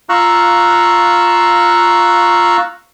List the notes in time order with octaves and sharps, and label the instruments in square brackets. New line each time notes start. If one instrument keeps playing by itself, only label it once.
[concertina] F4 F5 A#5 C#6 E6 F#6